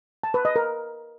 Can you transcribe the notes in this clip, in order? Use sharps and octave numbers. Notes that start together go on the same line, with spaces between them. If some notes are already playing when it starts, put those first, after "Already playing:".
A5
B4
D#5
A#4